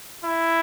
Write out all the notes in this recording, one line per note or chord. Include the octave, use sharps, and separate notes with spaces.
E4